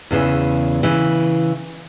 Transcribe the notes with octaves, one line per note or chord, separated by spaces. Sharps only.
E2 C#3 E3
C#3 E3